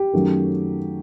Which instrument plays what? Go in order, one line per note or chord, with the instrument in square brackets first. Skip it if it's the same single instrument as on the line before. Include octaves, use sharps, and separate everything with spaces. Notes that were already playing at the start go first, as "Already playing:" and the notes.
Already playing: [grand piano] G4
F#2 D#3 F#3 A3